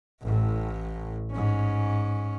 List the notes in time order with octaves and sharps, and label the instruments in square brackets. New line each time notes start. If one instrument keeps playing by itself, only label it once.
[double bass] A1 A2
G#2 C#4